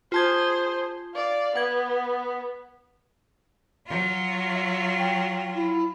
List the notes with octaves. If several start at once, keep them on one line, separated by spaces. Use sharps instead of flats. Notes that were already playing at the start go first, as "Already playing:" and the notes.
F4 G#4 C5 A5 G#6
D5 F5
B3 F#5 G#6
F#3 F4
E5
G5
E4